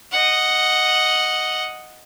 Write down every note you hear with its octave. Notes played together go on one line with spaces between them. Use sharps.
D#5 F#5